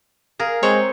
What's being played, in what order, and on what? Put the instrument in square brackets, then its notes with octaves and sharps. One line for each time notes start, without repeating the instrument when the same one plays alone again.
[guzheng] G#4 A#4 [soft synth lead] F5
[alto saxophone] G#3 [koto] C4 C#5 [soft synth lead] C5